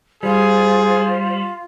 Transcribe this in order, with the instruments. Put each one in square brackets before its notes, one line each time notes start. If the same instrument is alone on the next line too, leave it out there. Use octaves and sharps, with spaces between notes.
[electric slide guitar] G3 [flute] F4 [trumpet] G#4 [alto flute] C5